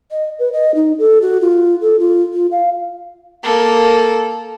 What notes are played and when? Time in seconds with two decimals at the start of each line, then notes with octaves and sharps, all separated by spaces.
0.11 D#5
0.39 B4
0.53 D#5
0.75 D#4
0.99 A4
1.22 F#4
1.41 F4
1.81 A4
2.00 F4
2.33 F4
2.51 F5
3.43 A#3 A4